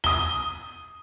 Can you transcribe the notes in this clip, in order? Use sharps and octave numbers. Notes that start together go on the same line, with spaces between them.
D#6 G7